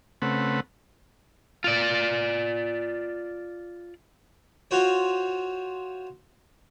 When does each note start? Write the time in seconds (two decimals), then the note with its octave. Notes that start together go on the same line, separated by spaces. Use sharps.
0.22 C#3 A3 C4 B4 F#5
1.64 F4 D5
4.71 F4 F#4 C5 C#5